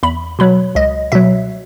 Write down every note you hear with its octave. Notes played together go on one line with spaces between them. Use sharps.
E2 B5
B2 F#3 B5
C#2 D#5
B2 F#3 E5